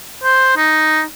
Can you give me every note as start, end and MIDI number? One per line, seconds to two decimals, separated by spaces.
0.23 0.54 72
0.57 1.03 63